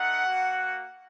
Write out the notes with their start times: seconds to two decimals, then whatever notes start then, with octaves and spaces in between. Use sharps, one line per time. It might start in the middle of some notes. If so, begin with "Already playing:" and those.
Already playing: A3 D#4 F#5
0.26 A#3 F#4